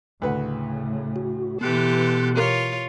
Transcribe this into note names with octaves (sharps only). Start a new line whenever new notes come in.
D2 A2 C#3 B4 F#5
F#4
B2 E3 B3 G4 A4 C6 F#6
F4 G4 A#4 C#5